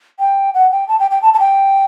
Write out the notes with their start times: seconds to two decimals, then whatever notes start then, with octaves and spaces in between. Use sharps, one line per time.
0.20 G5
0.54 F#5
0.72 G5
0.88 A5
1.00 G5
1.11 G5
1.22 A5
1.34 A5
1.40 G5